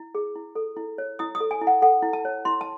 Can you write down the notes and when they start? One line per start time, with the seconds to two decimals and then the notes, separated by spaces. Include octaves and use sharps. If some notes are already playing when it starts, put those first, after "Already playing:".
Already playing: E4
0.15 G#4
0.35 E4
0.55 A4
0.77 E4
0.98 C#5
1.19 E4 D#6
1.35 D#6
1.40 A4
1.51 G#5
1.61 E4
1.67 F#5
1.82 A4 F#5
2.03 E4
2.13 A5
2.25 C#5
2.45 E4 C6
2.61 A5